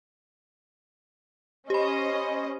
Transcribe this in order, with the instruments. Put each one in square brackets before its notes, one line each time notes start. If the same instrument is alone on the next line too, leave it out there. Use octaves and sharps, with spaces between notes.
[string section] C#4 C5 D#5 [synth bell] G4 B5